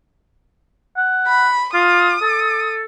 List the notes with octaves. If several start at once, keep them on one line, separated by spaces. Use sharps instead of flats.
F#5
B5
F4 D#6
A4